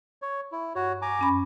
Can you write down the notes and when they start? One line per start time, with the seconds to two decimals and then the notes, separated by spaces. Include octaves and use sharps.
0.22 C#5
0.52 E4
0.75 G2 F#4 C#5
1.02 G#5 A#5 D6
1.19 F#2 C#4 B5